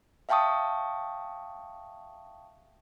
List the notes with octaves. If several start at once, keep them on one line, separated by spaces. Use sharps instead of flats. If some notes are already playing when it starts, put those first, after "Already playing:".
E5 F5 G5 A5 C#6 D#6